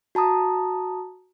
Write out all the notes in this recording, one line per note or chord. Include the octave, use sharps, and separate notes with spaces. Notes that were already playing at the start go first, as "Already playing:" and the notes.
F#4 A5 A#5 D#6